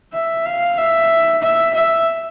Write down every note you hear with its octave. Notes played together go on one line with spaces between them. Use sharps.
E5
F5
E5
E5
E5